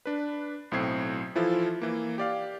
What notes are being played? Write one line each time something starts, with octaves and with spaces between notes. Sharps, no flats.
D4 B4
B1 A2 C4 G#6 C7
E3 F3 E4 F4 A4
E3 A#3
G4 D5 F5